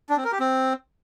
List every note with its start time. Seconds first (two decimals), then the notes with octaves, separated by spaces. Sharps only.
0.09 D4
0.17 C4
0.24 A#4
0.32 G4
0.40 C4